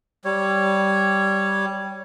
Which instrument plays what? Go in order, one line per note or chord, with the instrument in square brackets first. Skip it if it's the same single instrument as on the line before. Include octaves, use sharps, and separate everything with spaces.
[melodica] G3 C#5